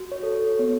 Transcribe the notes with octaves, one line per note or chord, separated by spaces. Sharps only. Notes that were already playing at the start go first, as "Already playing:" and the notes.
Already playing: F#4
C#5
A4
C#5
B3 C#5